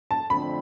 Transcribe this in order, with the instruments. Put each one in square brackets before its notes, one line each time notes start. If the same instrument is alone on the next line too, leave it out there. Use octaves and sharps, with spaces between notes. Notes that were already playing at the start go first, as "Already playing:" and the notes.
[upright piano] A5
[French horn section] F2 D3 F3 A3 C4 [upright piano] B5